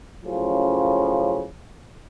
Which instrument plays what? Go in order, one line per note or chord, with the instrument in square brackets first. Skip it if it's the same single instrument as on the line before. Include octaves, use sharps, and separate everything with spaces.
[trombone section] F#2 A2 C#3 F3